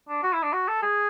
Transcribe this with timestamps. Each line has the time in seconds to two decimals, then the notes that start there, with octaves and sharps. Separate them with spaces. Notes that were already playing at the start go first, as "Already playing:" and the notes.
0.09 D4
0.23 F#4
0.33 E4
0.43 D4
0.53 F#4
0.68 A4
0.82 G#4